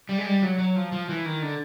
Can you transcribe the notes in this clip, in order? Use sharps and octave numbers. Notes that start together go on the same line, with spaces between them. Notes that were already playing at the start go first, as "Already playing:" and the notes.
G3
G#3
G3
F#3
F#3
F3
F3
E3
D#3
D3